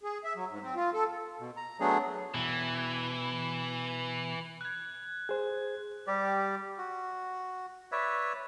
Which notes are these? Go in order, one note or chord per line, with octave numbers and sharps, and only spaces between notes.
G#4
E5
F#3
G#2
C4
F4
A4
B2
A#5
F#3 A3 B3 D4 G#4
B2 E3 E4
F#6 G#6
G#4 C5 F#6
G3 G4 D5
F#4
B4 C#5 D5 E5